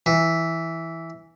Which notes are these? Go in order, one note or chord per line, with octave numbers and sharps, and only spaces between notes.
E3